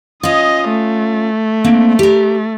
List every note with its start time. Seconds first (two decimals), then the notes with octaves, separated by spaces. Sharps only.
0.23 C#4 F4 D#5 D#6
0.69 A3
1.64 A#3 C4 D4
1.99 G4 A#4